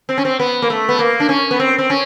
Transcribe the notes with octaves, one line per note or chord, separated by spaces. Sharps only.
C4
C#4
C4
B3
A#3
A3
B3
A#3
D4
C#4
B3
C4
C4
C#4